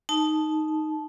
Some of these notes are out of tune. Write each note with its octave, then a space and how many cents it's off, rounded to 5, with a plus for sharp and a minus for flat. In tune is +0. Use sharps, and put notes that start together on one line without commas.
D#4 +0 A5 -15